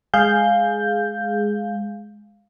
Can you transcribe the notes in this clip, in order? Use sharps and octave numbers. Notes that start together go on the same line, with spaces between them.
G#3 G#4 F5 G6